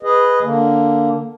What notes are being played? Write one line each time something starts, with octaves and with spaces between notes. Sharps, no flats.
G#4 B4 D#5
D3 A#3